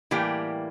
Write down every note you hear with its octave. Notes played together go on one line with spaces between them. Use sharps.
A2 E3 G3 A#3 G4